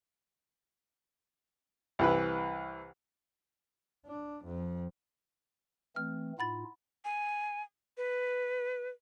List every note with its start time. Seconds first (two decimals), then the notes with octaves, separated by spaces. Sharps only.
1.99 C2 E3 B4
4.06 D4
4.44 F2
5.96 E3 A3 C4 F6
6.39 A2 D#4 F4 F#5 B5 A6
7.05 G#5
7.97 B4